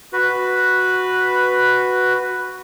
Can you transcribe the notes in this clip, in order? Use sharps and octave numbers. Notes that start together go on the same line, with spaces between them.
F#4 B4